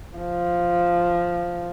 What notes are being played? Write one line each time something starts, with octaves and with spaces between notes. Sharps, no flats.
F3